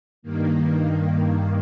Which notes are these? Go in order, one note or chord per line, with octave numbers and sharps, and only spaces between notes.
G2 D#3 A#3